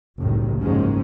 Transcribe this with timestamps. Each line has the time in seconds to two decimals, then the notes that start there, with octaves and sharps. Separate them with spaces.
0.20 F#1 C2 A2 D#3
0.61 F#1 G#2 D#3 F3 G#3 C#4